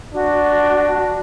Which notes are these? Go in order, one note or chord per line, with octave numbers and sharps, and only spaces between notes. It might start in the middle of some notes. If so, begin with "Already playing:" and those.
D4 F#4